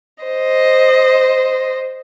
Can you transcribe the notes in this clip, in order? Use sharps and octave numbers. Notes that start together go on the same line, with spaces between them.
C5 D#5